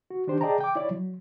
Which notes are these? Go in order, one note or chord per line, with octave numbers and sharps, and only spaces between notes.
F#4
D#3 D4 G4 C5
G#4 D5 D#5 G5 A5 A#5
G5 D6
E4 C#5 D5
F#3